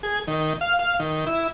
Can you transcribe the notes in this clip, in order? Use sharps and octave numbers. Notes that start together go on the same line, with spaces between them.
G#4
D#3
F5
F5
D#3
E4